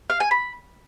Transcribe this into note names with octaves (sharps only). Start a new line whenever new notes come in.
F5
G#5
B5